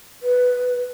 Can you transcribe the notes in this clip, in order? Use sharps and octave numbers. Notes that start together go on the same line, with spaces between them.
B4